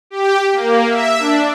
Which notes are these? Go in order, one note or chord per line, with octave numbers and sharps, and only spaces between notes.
G4
A#3
E5
D4